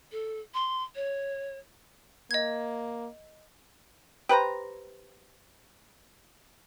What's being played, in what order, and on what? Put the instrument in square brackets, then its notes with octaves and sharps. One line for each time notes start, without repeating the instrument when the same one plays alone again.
[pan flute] A4
C6
C#5
[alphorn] A#3 [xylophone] D#5 G#6
[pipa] G4 B4 C5 A#5